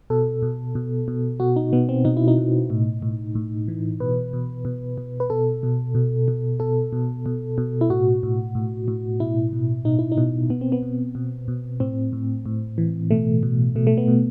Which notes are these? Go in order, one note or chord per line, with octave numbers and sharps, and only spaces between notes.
B2 A4
B2
B2
B2
B2 F#4
D#4
B2 B3
C4
B2 D#4
E4
D#4
B2
A2
A2
A2
E3
B2 B4
B2
B2
B2
B4
B2 A4
B2
B2
B2
B2 A4
B2
B2
B2
E4
A2 F#4
A2
A2
A2
B2 E4
B2
B2 D#4
E4
D#4
B2
B2 B3
C4
B3
B2
B2
B2
A2 C4
A2
A2
E3
B2 A3
B2
B2 A3
A3
B3
B2